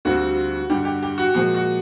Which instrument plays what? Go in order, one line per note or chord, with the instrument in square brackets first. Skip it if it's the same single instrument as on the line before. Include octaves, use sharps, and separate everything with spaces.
[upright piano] D2 D3 G3 C4 F4 [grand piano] F#4
[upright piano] G2 D3 G3 [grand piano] G4
[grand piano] G4
G4
F#4
[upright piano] A#2 F3 G#3 [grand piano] F#4
[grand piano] F#4